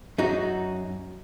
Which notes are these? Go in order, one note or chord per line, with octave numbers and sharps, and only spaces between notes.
F#2 D#4 F#4